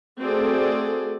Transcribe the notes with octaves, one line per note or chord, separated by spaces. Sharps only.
A3 C4 F#4 G#4 A4 D5